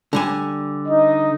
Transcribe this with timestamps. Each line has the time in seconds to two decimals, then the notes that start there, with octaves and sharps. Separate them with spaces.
0.13 D3 G3 G#5
0.88 D#4 D#5